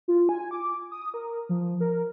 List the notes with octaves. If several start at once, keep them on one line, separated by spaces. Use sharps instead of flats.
F4
G#5
D6
D#6
A#4
F3
A#4